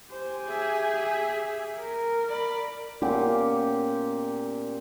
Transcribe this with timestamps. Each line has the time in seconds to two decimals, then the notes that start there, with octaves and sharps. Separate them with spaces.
0.11 G4 C5 G#5
0.46 G#4 E5
1.80 A#4
2.29 D5 B5
3.02 A#2 B3 C#4 G4